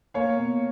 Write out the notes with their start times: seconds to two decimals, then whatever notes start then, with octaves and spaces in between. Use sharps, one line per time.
0.14 A#3 C#5 F5
0.37 B2